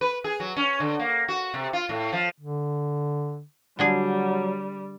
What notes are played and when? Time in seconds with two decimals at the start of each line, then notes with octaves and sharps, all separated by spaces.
0.01 B4
0.24 G#4
0.40 F#3
0.57 C#4
0.80 D3
1.00 A#3
1.28 F#4
1.54 C3
1.73 F4
1.89 A2
2.13 F3
2.40 D3
3.79 D3 F#3 G3 D4 G#4